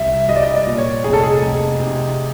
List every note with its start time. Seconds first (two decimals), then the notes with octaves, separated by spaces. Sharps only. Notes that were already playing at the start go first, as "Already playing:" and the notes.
Already playing: C2 E5
0.28 G3 D#5
0.36 D5
0.43 D#5
0.54 D5
0.67 A#2
0.78 C#5
1.04 F1 G#4
1.13 A4
1.23 G#4
1.42 F1
1.80 C3